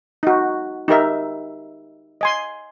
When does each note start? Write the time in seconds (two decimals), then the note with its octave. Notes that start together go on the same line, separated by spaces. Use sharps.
0.23 D#4 F#4
0.88 D#4 G4 A#4 E5
2.21 D#5 G#5 C6